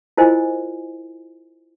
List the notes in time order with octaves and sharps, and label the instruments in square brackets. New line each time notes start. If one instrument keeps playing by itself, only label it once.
[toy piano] E4 F4 A#4 C5 D#5 G#5